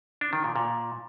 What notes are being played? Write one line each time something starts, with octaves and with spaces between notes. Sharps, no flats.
D4
D#3
A#2
A#2